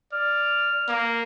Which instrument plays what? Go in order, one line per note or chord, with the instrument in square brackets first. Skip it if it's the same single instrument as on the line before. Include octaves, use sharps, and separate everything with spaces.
[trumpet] D5 [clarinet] F6
[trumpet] A#3